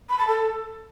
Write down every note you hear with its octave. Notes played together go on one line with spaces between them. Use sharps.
B5
A5
A4